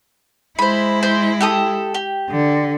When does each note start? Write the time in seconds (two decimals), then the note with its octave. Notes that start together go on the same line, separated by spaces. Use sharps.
0.59 G#3 E4 C5 B5
1.03 C5
1.41 G4 A4 D#6
1.94 G4
2.30 D3